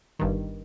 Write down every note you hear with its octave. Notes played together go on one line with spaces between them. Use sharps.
G1 G2 D#3